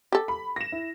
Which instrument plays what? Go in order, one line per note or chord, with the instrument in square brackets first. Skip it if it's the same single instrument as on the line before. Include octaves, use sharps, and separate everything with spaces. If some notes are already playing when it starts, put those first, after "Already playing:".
[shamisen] G4 A4
[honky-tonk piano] B5
A#6 E7
E4